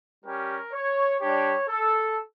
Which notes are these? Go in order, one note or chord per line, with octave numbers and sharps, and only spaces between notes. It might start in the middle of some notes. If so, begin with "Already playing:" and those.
G3 C#4 G4 A#4
C#5
G3 D4 G4 C#5
A4